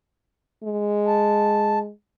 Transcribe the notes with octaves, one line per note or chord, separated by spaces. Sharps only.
G#3
A5